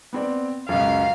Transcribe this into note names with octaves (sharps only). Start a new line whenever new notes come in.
B3 C4 D5
C#2 F#2 F5